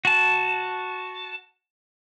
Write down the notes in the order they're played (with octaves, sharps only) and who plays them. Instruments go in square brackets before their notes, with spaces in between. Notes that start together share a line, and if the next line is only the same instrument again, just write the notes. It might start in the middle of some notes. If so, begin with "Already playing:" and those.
[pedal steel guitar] F#4 A5